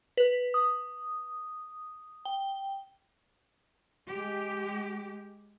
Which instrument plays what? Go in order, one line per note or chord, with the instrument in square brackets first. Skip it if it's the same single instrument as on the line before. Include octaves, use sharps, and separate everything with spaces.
[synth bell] B4
D#6
G5
[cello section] G#3 G4